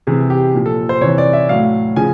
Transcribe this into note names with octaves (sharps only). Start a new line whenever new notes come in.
C3 E3 G#4
G4
A#2 F3
A4
C5
C3 E3 C#5
D5
E5
A2 F#3 F5
C#3 F3 G#5